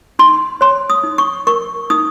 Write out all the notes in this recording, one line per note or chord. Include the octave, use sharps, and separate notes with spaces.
D#4 C6
C#5 C6
D#6
D#4
C#6
A#4 C#6
D#4 D#6